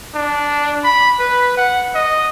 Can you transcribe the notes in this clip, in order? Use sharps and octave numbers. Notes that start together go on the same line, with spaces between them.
D4
B5
B4
F#5
D#5